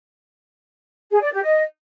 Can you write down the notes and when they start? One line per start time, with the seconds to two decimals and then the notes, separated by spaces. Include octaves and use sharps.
1.11 G#4
1.21 D5
1.32 G4
1.43 D#5